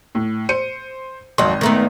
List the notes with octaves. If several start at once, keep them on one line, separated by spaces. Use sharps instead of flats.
A2
C5 C#7 D#7
G#1 F2 F#3 D#5 C6
D#3 A3 B3